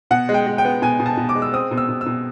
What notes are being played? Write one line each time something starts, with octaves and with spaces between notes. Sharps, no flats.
B2 F#5
G#3
G5
G#3
G5
B3
B2 G#5
B2
A5
B2
D6
G#3
E6
C4 D#6
B2
E6
B2
E6
B2